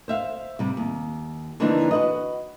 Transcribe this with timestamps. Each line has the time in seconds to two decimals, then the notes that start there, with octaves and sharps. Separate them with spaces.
0.08 C5 E5 F5
0.59 C3 G3
0.77 D#2
1.60 D3 E3 F3 A#3 D4 D#4
1.91 F#4 B4 D#5